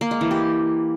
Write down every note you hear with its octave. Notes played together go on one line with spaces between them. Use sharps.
A#3
G#3
E3
G4